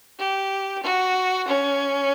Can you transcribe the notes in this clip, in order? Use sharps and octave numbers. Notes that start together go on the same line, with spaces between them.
G4
F#4
C#4